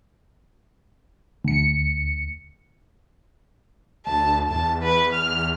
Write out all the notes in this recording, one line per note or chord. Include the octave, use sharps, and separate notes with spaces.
D2 C#7
D2 A5
E2 A5
B4
F6